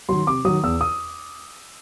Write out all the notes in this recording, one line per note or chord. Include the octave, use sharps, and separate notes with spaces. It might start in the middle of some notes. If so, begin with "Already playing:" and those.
D#3 F#3 C6
C3 D6
D#3 F#3 D#6
E2 E6
D#6